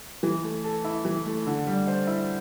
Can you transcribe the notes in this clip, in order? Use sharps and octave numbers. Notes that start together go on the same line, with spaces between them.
E3
A3
A4
E4
E3
A3
D3
G3
C5
E4